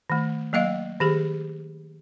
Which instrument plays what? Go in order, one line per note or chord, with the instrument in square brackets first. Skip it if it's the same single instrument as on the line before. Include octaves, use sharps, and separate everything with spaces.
[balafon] D#3 A3
F#3 A#3 D#5 F5
D#3 G4 G#4